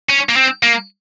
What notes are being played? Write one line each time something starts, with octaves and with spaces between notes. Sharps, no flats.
C#4
A#3
C4
A#3